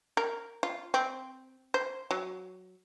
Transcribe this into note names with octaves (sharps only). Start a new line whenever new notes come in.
A#4
F4
C4
C5
F#3